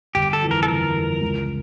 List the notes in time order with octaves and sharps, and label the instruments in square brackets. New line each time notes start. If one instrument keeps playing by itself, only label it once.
[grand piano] G1 [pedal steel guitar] G4
[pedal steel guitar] A4
[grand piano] F2 E3
[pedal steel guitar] A#4
A4
[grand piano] G1 [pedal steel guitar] A#4
[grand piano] F2 E3
C#2